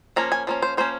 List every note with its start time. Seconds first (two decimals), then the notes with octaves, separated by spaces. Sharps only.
0.16 F3 A#3 C#4 A#5
0.32 G#5
0.47 F3 A#3 C#4
0.62 C5
0.77 F3 A#3 C#4 C5